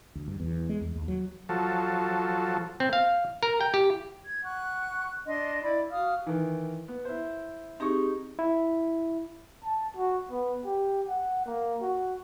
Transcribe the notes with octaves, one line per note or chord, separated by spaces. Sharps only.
D2
G2
E2
G#3
E2
D#2
F#3
F3 F#3 A4
C4
F5
A#4
G5
G4
G#6
F#5 C#6 F#6
D4 D#5 C6
E4 D5 B5
F#4 F5 D#6 F6
D#3 E3
B3
E4 C5
C4 D#4 G4 G#4 C#6
E4
A5
F#4
B3
G4
F#5
A#3
F#4